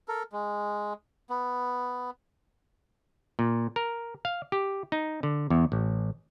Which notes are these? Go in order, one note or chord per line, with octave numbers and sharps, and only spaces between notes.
A4 A#4
G#3
B3
A#2
A#4
F5
G4
D#4
D3
E2
A1